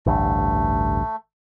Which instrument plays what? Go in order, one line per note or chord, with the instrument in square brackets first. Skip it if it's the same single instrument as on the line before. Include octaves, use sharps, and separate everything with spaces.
[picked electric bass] A1 D2 G2 [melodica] A3